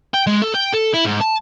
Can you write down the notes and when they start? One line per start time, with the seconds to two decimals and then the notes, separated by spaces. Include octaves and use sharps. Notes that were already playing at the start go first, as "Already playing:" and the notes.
0.14 G5
0.27 G#3
0.42 A4
0.54 G5
0.74 A4
0.94 E4
1.06 G#2
1.21 A5